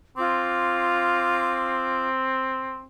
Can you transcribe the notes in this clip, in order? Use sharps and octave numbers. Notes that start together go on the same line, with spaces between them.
C4 F4 D6